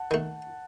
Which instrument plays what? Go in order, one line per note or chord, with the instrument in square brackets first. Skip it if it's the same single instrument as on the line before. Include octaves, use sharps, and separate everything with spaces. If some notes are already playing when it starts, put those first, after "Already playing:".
Already playing: [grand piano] F#5 A5
[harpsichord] D#3 A3